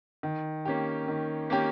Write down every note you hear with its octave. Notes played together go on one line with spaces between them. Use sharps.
D#3
A#3 C#4 G4
D#3
A#3 C#4 G4